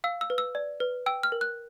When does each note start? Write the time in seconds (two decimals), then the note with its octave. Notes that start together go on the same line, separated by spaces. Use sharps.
0.04 F5 E6
0.21 E6
0.30 B4
0.38 E6
0.55 D5
0.80 B4
1.06 G5 E6
1.23 F6
1.32 A#4
1.41 F#6